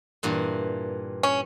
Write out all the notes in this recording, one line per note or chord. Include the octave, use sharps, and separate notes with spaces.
G2 A#2 E3
C#4